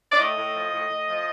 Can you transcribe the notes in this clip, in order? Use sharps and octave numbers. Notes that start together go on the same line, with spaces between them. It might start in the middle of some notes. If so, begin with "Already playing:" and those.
D5
A2 D#5
A2
F3
A2
A2
F3